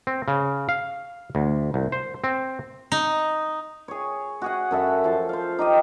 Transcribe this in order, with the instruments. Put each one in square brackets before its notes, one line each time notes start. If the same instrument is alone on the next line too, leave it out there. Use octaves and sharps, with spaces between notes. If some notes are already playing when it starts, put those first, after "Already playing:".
[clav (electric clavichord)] C4
C#3
F5
D2
C2
C5
C4
[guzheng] D#4
[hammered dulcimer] G#4 C#5
F#4 G#4 F#5
F#2 A4 E5
F3 A5
C5 F5
D#4 G4 D#5